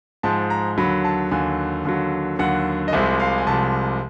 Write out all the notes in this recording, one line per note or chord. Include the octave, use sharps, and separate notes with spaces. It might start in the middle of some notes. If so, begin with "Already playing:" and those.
G#2 F3 G#3 A5
A#5
D#2 D3 F#3 B5
A5
D#2 D3 F#3 G#5
D#2 D3 F#3
D#2 D3 F#3 F#5
D#5
C2 C3 F3 G#3 E5
F5
G#5
C2 C3 F3 G#3 A5